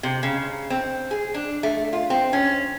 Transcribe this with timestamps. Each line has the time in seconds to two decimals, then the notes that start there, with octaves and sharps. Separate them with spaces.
0.03 C3
0.23 C#3
0.70 C4
1.11 G#4
1.34 D4
1.63 A3
1.93 F4
2.10 C4
2.33 C#4